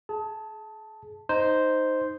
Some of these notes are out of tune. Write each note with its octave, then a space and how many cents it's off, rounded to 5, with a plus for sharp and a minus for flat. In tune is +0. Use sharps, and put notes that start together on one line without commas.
G#4 +30 A5 +0
D#4 +0 C5 -5